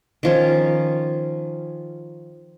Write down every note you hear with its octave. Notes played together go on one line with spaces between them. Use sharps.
D#3 F3 C#4